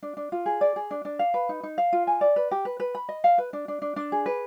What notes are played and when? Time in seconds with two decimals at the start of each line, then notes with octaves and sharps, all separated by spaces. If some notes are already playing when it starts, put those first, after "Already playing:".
0.03 D4
0.17 D4
0.32 F4
0.46 G#4
0.61 D5
0.76 G#4
0.91 D4
1.05 D4
1.19 F5
1.34 B4
1.49 D#4
1.63 D#4
1.78 F5
1.93 F4
2.07 G#5
2.21 D5
2.36 B4
2.51 G4
2.65 B4
2.80 B4
2.95 B5
3.09 D#5
3.24 F5
3.38 B4
3.53 D4
3.68 D4
3.82 D4
3.96 D4
4.12 G#4
4.26 B4